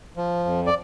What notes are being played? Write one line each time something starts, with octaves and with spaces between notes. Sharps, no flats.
F3
F2
D5